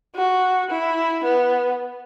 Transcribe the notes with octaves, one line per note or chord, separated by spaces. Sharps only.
F#4
E4
B3